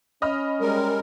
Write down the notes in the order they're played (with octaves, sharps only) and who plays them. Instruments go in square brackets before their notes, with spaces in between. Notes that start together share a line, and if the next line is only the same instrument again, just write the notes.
[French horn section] C#4 [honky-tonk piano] D#5 B5 F6
[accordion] G3 G#3 A#4